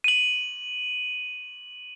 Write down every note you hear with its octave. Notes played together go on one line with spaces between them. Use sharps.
D#7 F#7